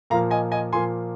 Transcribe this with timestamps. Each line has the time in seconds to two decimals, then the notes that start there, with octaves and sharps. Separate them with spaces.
0.10 A#2 F3 A#3 F5 A#5
0.31 D#5 G#5
0.51 D#5 G#5
0.73 A#2 F3 A#3 G#5 C6